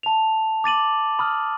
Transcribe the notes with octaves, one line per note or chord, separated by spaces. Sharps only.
A5 F7
D6 A6 D#7 F#7
B5 D#6 F6